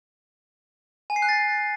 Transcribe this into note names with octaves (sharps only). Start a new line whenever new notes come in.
G#5
C7
F#6
A6